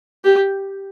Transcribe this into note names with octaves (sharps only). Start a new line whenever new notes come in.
G4